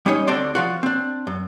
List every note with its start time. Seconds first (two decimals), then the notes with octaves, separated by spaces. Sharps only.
0.06 G3 C#4 D#4 C#5
0.27 D2 D3 C4 D4 D5 C6
0.55 F3 F4 F#4
0.83 C4 D4
1.27 F#2